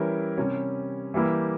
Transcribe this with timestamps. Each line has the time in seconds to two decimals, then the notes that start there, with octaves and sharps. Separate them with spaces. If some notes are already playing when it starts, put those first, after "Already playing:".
Already playing: E3 G3 C#4 E4 A#4
0.37 C3 G3 C#4
1.14 E3 G3 A#3 E4 G4